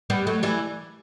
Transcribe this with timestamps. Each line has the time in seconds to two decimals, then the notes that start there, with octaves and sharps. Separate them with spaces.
0.10 G3 B3
0.27 F#3 A3
0.43 E3 G3